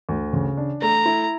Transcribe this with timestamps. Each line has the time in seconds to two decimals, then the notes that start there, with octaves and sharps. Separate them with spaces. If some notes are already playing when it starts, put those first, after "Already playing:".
0.09 D2
0.33 C#3
0.57 D4
0.82 A3 A#5
1.06 E4